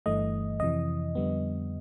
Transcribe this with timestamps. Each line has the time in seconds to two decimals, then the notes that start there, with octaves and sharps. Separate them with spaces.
0.06 G1 G2 E3 A3 D#5
0.60 F2 C3 E3 D#5
1.15 F2 D3 G3 B3